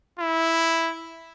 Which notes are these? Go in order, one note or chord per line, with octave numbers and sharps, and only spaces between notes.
E4